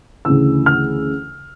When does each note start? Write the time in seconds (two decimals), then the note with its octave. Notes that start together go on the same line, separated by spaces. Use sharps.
0.25 D2 C#3 E3 E6
0.66 F6